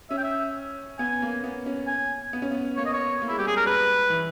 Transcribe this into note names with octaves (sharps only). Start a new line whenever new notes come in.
C#4 E5
G5
E5
B3 G#5
A#3
B3
C#4
G#5
B3
C#4
B3
A#3 C#5
D#5
C#5
A#3
G#3 E4
G3 G4
G#3 G#4
A#4
G3 B4
E3